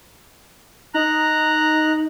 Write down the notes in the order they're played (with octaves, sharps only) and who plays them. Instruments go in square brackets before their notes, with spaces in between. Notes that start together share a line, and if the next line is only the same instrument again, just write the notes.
[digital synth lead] D#4 [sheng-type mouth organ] A#5 F#6